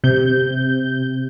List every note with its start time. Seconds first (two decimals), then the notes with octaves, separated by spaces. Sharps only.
0.04 C3 G6